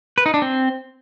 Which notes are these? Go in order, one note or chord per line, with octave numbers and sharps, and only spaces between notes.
B4
D#4
D4
C4